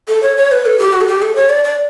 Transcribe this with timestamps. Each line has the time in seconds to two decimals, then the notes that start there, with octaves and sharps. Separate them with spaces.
0.08 A4
0.23 C#5
0.37 C#5
0.52 B4
0.66 A4
0.79 G4
0.93 F#4
1.01 A4
1.08 G4
1.22 A4
1.36 C#5
1.50 D5
1.64 D5